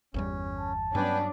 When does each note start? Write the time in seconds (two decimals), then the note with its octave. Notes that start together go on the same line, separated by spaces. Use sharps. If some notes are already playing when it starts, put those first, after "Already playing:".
0.14 G1 E2 G3 C#4
0.58 A5
0.95 G2 F#3 B3 C#4 D4 B4 G5 G#5